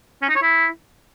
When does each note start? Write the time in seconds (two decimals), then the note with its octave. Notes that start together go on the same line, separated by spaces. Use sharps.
0.22 C#4
0.29 D#4
0.36 C#5
0.43 E4